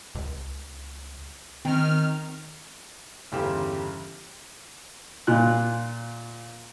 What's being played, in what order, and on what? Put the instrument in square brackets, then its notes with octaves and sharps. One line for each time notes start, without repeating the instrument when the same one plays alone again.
[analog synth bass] C#2
[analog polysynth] D#3 F6 [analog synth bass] C4
[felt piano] G1 E2 C#3 G4 C6 E7
[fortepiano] A#2 F4 F#6